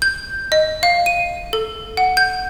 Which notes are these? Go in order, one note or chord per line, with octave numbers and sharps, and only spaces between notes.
G6
D#5
F5
D#7
A4
F#5
G6